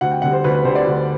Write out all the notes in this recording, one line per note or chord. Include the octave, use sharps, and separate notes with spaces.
D2 F#5
G5
D3 G3 F#5
C5
D2 B4
B4
D3 G3 C5
D5
D2